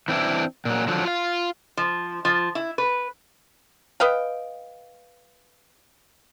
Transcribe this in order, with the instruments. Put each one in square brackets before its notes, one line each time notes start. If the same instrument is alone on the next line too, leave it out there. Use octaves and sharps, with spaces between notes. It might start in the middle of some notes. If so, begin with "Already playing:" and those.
[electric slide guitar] E3 C4 D4 E4
A#2 F#3
D3 F3 F#3
F4 F5
[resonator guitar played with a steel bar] F3
F3
E4
B4
[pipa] B4 D#5 F5 G5